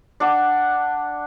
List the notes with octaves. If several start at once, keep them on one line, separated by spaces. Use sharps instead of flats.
D4 F#5 D6